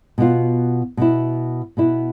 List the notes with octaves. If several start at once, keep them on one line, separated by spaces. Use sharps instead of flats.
B2 B3 F4
B2 B3 E4
B2 B3 E4